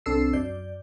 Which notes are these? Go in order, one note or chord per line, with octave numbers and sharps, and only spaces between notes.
C2 C4 D4 A4 E6 C7
F#2 D5 G6